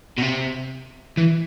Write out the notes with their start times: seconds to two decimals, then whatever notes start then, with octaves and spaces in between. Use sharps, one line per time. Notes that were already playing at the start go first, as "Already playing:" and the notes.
0.18 B2
0.22 C3
1.17 E3